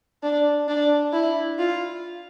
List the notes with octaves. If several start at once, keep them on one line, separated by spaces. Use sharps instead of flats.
D4
D4
E4
F4